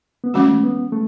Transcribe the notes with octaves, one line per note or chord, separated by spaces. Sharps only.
B3
E3 G#3 A3 C#4 F#4
B3
A3